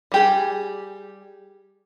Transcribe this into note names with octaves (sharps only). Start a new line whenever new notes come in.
G3 G4 G#4